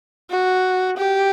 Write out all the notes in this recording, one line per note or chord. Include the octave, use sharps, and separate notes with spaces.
F#4
G4